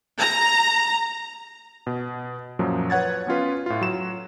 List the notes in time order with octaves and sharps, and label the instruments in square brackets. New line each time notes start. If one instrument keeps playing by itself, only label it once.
[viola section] A#5
[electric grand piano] B2
F#2 A#2 F3 F#3
B4 C#5 F#5 G#6 A6
B3 C#4 F4 B4
A2 F4
F#3 E7